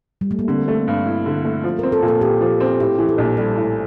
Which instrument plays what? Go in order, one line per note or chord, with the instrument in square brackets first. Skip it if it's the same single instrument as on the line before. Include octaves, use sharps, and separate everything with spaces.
[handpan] G3
A3
A#3
[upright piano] D3 [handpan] C4
[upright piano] A3
G2
E4
D3
A3
F3
[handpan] A#4
[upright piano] C4
[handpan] A4
[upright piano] A#2
[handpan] A4
[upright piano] A#2 [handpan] G4
[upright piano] F3
C4
[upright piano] A2 [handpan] G4
[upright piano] E3
[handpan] A4
[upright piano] A#1
[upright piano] G3 [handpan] A4
[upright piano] A2